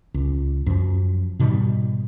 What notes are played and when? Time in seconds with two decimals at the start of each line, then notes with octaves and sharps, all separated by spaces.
0.14 C#2
0.66 F#2 F3
1.39 G#2 B2 D#3 G3